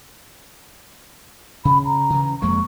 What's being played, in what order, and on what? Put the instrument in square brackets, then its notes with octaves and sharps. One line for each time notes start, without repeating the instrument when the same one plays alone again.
[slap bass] C#3 [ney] B5
[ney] A#5
[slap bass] C#3 E3
[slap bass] F2 G#3 A#3 [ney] C#6